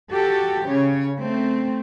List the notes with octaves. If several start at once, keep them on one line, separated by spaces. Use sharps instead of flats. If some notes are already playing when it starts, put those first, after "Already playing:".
F#4 G4 A4
C#3 C#5
A3 C4